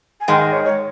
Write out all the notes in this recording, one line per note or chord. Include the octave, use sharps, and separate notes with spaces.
G#5
G#2 D#3 G#3 G5
D#5
C#5
C#5